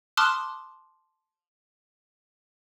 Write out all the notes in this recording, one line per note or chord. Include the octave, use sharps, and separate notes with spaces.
A5 C6 D6 D#6 F6 F#6